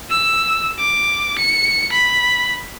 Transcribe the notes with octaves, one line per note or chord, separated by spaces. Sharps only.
E6
D6
C#7
B5